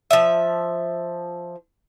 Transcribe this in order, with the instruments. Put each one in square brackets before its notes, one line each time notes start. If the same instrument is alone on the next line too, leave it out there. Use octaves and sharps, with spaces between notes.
[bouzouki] F3 E5